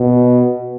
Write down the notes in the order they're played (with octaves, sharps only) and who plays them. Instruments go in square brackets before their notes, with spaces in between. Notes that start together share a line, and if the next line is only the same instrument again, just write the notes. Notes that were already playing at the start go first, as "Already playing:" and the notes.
Already playing: [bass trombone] B2